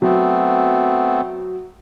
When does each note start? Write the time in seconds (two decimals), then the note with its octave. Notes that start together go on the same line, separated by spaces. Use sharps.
0.02 F#3 A3 B3 C4